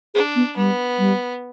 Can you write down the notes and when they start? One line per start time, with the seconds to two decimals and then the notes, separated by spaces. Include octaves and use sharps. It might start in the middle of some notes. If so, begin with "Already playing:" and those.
0.14 D4 G#4
0.36 B3
0.57 G3 B3
0.99 G3